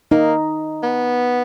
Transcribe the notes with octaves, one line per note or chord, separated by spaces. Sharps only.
A#3 D#4
B3